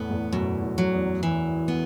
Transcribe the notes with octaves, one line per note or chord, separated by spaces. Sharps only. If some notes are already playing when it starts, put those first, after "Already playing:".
Already playing: E2 A2 B3
E2 A2
F#2 B2
F#2
F#3
E2
E3
B3